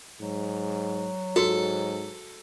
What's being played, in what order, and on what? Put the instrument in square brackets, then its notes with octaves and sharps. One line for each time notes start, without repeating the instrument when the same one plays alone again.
[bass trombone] G#2 [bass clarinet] F#3
[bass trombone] G#2 [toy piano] F#4 [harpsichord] A4